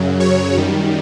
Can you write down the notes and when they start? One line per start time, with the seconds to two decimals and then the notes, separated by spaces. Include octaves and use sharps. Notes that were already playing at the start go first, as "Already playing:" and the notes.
Already playing: F#2 C#3 F#3
0.20 C#5
0.56 F#2 D#3 G3